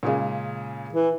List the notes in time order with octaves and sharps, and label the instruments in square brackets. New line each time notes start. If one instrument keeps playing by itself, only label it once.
[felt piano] A#2 C#3 G#3
[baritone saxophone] E3